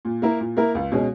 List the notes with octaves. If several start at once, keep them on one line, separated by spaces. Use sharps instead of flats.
A#2
A#3 E4 A#4
A#2
A#3 E4 A#4
C#2
B2 G#3 C#4